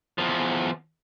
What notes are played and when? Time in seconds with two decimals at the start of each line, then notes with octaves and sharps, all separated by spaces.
0.18 E2 F3